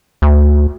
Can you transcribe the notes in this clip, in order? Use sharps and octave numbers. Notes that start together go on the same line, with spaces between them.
D2